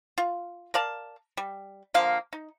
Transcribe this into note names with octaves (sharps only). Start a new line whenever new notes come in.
F4
A#4 D5 F5 A5
G3
D3 F3 A#3 F5
D#4